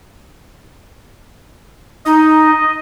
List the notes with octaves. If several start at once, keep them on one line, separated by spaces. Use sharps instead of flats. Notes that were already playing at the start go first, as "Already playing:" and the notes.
D#4 D#5